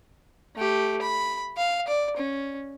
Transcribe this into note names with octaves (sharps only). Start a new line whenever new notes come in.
A3 G4
B5
F5
D5
C#4